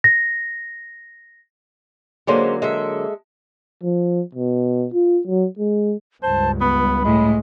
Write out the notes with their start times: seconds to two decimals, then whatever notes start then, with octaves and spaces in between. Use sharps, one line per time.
0.04 A#6
2.27 D3 F#3 G#3 A#3 C#4 C5
2.62 G#3 A4 E5
3.83 F3
4.35 B2
4.94 F4
5.27 F#3
5.59 G#3
6.23 C#2 G2 C5 A5
6.61 B3 B5
7.05 A2 G#3